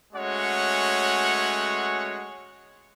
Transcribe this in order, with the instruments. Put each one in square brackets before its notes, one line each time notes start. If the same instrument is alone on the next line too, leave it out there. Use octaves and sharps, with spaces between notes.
[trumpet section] G#3 A3 C#4 F#4 C#5 F#5